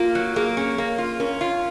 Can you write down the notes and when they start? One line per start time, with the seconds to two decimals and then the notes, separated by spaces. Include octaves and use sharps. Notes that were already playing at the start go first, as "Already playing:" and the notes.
Already playing: A#3 F4
0.15 F#3
0.36 A#3 G#4
0.57 C#4
0.78 A#3
0.98 F4
1.20 C#4 A#4
1.41 F4